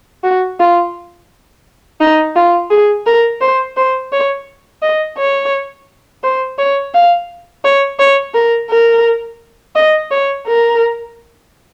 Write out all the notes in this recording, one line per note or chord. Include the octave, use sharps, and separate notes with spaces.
F#4
F4
D#4
F4
G#4
A#4
C5
C5
C#5
D#5
C#5
C5
C#5
F5
C#5
C#5
A#4
A#4
D#5
C#5
A#4